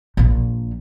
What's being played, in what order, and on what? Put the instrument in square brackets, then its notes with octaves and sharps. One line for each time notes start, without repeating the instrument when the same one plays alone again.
[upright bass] A#1 A#2